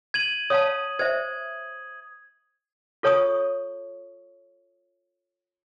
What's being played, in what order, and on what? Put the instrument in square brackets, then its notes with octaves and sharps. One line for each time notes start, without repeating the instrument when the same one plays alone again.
[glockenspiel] G#6 D#7 F#7
[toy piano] C#5 F5 A5 [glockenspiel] D#6
[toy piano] C5 E5 [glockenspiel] G#6
[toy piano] F4 A4 C#5 A5 C#6 D#6